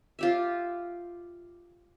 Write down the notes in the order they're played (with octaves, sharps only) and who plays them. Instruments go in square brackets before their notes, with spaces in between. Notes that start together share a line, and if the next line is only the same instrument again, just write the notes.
[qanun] F4 G4 E5